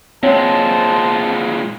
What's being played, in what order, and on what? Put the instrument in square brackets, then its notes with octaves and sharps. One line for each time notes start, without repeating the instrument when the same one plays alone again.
[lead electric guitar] A#2 G#3 [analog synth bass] C4 [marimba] C#5 [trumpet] A5